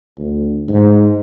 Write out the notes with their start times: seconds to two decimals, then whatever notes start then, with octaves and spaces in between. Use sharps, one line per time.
0.18 D2
0.69 G#2